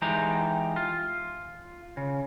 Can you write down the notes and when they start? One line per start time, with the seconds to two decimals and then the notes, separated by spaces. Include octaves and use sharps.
0.02 E3 G#3 D#4 G4 A#5
0.76 F4
1.97 C#3